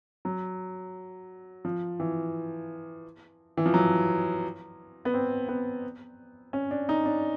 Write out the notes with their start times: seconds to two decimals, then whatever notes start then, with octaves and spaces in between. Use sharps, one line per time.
0.25 F#3
1.65 F3
2.00 E3
3.57 E3
3.66 F3
3.74 F#3
5.05 B3
5.14 C4
5.48 B3
6.53 C#4
6.71 D4
6.89 D#4
7.05 D4